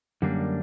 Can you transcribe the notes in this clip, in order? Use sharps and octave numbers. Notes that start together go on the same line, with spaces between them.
F#2 D3 G3 A#3 D4